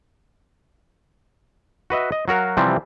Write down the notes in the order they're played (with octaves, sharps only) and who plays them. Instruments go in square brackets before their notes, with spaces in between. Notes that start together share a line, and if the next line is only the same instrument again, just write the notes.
[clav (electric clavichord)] F#4 B4 D#5 E5
D#5
F#3 F#4 A#4 F5
C3 E3 F3 G3 C4